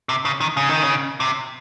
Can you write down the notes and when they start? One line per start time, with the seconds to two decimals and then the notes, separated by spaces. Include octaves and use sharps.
0.09 C3
0.25 C#3
0.41 D#3
0.57 C#3
0.69 D#3
0.83 C#3
1.20 C3